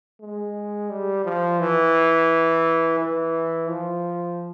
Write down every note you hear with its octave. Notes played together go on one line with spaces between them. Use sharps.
G#3
G3
F3
E3
E3
F3